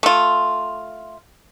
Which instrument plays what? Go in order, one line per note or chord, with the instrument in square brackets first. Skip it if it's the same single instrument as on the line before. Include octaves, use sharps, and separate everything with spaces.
[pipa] A3 F4